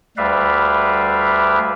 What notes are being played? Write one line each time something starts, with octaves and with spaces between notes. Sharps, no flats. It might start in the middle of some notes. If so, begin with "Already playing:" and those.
D2 G3 B4 D5 E5 F5